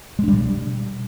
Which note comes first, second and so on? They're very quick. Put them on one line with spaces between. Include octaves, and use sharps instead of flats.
G#3 D4 G3 B2